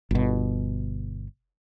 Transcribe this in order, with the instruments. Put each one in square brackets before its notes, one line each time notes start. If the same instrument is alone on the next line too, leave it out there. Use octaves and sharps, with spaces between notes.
[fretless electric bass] G1 B2